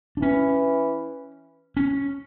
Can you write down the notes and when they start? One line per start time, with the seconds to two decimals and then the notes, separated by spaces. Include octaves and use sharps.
0.17 D4
0.22 E3 C#4
1.77 C#4